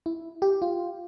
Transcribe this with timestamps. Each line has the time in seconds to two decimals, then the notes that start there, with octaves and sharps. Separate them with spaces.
0.06 E4
0.42 G4
0.62 F4